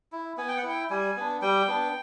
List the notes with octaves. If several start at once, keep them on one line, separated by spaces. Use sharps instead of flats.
E4
B3 G#5
G5
F#5
E4 G5
G3 G#5
B3 D4
G3 G5
B3 D4